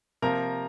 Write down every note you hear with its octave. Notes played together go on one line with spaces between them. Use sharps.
C3 F3 A#3 A#4 A#5